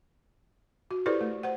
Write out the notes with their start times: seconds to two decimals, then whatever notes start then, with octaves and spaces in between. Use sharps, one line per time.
0.91 F#4
1.06 E4 G4 A4 B4 C5 D5
1.21 A3
1.43 C5 F#5